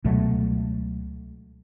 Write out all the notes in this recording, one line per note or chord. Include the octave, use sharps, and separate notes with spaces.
C#2 B2 F#3 A3